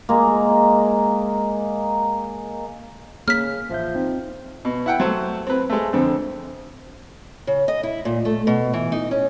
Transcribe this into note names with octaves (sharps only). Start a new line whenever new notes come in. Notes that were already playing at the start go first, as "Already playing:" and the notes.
G#3 A#3
C#3 A#3 F6 B6
A1 F3 E5 G6
C4 D#4
B2
E4 F#5 G5
F#3 A3 C5
C4 B4
G#3 A3
F2 D3 C4
C#3
D#5
E4
A#2
A3
B2
E3
D#4
C#4